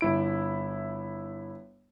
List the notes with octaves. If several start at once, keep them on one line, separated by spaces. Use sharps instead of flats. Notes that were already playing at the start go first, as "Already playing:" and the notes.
G1 E4 D7